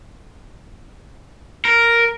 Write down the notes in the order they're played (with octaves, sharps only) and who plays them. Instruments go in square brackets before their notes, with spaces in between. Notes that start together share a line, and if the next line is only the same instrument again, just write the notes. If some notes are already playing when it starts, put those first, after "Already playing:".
[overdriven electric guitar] A#4